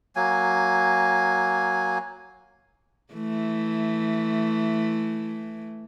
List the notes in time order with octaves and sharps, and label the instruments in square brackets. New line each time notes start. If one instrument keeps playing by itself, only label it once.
[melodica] F#3 A#3 G#5
[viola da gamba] E3 A3